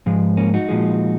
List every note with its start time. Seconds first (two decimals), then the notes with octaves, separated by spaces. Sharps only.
0.06 G#2 F3 G#3
0.37 A#3 C#4
0.54 D#4 F#4
0.68 A#2 F3 G#3